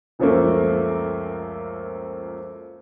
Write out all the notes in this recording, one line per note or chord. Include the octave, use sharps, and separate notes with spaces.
C#2 F#2 F3 A3 A#3